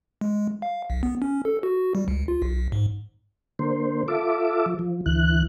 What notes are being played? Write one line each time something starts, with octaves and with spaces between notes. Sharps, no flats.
G#3
F5
B1
B3
C#4
A4
F#4
G3
C#2
F4
B1
G#2
D3 A#3 C5
F4 A4 E5 D6
F3
F3
D2 E3 F#6